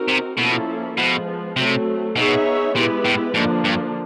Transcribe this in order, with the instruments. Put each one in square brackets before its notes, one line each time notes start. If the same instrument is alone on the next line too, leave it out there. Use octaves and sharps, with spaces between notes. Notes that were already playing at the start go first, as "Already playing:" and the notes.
Already playing: [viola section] C4 D#4 F#4 A#4
[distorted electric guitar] C3
[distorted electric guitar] B2 [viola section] F3 A#3 C#4 E4 A4
[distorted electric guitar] B2 [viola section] F3 G#3 B3
[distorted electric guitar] C3 [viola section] F#3 A3 C4
[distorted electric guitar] B2 [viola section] B3 D#4 G#4 C#5 E5
[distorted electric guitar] A#2 [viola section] G#3 B3 E4 G4 B4
[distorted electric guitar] A2
[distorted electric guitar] G#2 [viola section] D3 F3 A#3 D4
[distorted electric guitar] G2